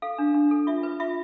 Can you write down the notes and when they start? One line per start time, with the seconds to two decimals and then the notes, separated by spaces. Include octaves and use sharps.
0.02 A4 F5
0.18 D4
0.35 D4
0.51 A4
0.67 F4 E5
0.83 B4
1.00 F4 E5